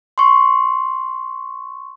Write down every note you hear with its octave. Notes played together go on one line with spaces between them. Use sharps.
C6 C#6